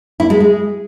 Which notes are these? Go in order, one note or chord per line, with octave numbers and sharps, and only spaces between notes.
E4
G#3
G#3